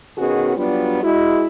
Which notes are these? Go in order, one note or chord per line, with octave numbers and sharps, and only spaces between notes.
B2 D#3 B3 C#4 F#4 G#4
F#3 G3 B3 D4 F4
G#3 E4 F#4